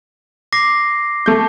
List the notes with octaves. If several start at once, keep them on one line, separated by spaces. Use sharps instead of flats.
D6 A#6 C7
A3 G6